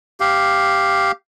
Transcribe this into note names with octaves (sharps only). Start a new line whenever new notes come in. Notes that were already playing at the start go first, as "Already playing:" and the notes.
G4 F5